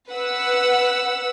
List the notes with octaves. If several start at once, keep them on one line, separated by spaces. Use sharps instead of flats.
B4 F#5 E6